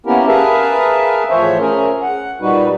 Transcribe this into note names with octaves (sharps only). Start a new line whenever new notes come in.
A#3 B3 C#4 E4 G4 A#4
G#4 A#4 B4 E5 F5 A5
A2 E3 F3 C5 C#5 E5
C#4 G#4 A#4
F#5
A#2 G3 D#4 F#4 B4